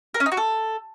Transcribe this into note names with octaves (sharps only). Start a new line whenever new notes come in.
A#4
C#4
D#4
F#4
A4